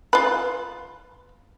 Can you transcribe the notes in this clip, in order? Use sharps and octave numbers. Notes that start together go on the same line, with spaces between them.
F4 B4